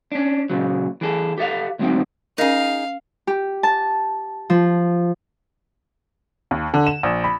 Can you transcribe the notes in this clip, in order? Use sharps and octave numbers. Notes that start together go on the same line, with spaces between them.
C#4 D4
A#2 C#3 F#3
E3 G#4 A4
G4 A4 E5 F5
D2 G#2 F#3 C4 D#4 G5
C#4 D#4 G#4 A#4 F5
G4
A5
F3
D#2
D3
E7
A#1
B5